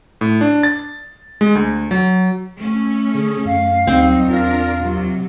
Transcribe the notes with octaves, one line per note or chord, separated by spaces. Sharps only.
A2
D4
A6
G#3
D2
F#3
A3 C#4
D3 G#4
F#2 F5
D2 F#3 G3 C4 D#4
E2 D4 F4 A#4
C3 F#3